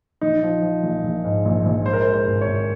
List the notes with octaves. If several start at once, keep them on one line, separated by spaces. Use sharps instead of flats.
A#1 D#4
F3
F3
A#1
A#1
G#2
A#1
A#1
G#3 C5
A#4
C5
G#3
C5
G#1
C#5
G#1